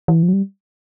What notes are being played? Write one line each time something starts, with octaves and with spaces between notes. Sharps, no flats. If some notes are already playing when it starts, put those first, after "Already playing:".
E3
F3
F#3
G3